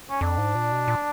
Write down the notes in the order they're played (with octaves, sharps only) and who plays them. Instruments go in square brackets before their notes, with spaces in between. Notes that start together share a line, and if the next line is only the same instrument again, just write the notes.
[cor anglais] C#4
[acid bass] F2 [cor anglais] D4
[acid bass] G#2
A#2
B2
A#2